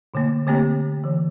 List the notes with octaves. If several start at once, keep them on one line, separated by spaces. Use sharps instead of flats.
B2 D3 A3 A#3
D3 A3 A#3 C4 G4 C#5
D3 E3